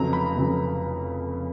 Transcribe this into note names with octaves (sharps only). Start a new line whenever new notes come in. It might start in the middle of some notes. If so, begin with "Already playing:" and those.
Already playing: F1 F2 C#3 F#3 A#5
B5
F1 F2 C#3 F#3